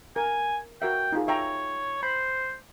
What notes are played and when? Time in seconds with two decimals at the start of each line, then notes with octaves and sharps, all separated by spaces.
0.16 A#4 G#5
0.82 F#4 A#4 E5 G5
1.12 D#4 F4 G#4
1.28 C#5 E5 G5 A#5
2.03 C5 B5